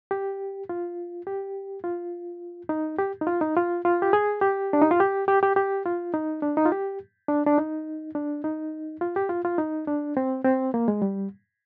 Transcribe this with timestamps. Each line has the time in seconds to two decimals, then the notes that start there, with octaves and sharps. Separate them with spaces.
0.11 G4
0.69 F4
1.27 G4
1.84 F4
2.69 D#4
2.99 G4
3.21 D#4
3.27 F4
3.41 D#4
3.56 F4
3.85 F4
4.02 G4
4.13 G#4
4.41 G4
4.73 D4
4.82 D#4
4.91 F4
5.00 G4
5.28 G4
5.43 G4
5.56 G4
5.86 F4
6.14 D#4
6.42 D4
6.57 D#4
6.66 F4
6.72 G4
7.29 D4
7.47 D4
7.58 D#4
8.15 D4
8.44 D#4
9.01 F4
9.16 G4
9.29 F4
9.45 F4
9.58 D#4
9.87 D4
10.17 C4
10.45 C4
10.74 A#3
10.88 G#3
11.02 G3